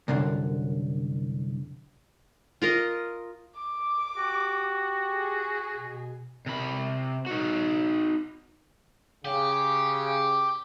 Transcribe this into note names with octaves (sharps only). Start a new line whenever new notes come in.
C2 F#2 D3
F4 A#4 D#5
D6
F#4 G4
G#4
B2
C3 B5
D#4 F#4
C#3 G4